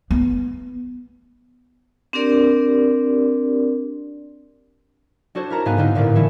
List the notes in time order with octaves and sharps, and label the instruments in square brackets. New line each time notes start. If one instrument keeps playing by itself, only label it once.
[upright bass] B3
[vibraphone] C4 D4 G4 A#4 D5
[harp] D4 F#4 A4 C5 C#5
E4 A#4 A#5 A6
G#2 B3 F5 G#5 F#6
D3 B3 C4 D#4 A#4
G1 A2 D3 A#4 D5
E3 A3 C#4 E4